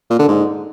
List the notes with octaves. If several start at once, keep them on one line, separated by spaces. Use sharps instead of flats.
A#2
D3
G#2